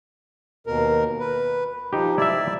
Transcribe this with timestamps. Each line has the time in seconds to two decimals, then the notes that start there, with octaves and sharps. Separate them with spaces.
0.67 D#2 B2 A#4
1.20 B4
1.93 F3 D#4 G4
2.18 E4 D5 E5